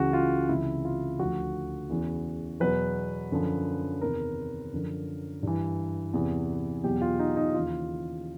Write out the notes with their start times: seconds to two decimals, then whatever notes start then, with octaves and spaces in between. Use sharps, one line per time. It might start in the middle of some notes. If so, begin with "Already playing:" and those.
Already playing: C#2 C#3 E3 F#4
0.13 F4
0.49 C#2 C3 E3 E4
0.85 F4
1.19 D2 D3 F3 F#4
1.90 E2 C#3 E3
2.60 E2 B2 F#3 B4
3.32 F#2 D3 F3
4.01 E2 C3 D#3 A#4
4.72 F#2 D3 F3
5.43 G2 E3
6.13 E2 C3 E3
6.84 E2 B2 F#3 G4
7.01 F4
7.19 D#4
7.36 D#4
7.54 D#2 C#3 E3 F4